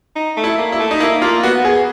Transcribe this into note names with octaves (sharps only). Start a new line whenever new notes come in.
D#4
A3
E4
A#3
E4
A3
D#4
A#3 E4
A#3 F4
B3 F#4
B3 G#4